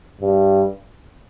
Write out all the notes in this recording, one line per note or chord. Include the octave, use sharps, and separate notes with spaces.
G2